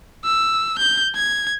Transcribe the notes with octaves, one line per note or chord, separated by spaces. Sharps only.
E6
G6
G#6